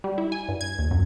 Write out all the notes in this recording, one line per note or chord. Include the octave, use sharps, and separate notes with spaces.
G3
E4
G#5
G2
G#6
D#2
F#2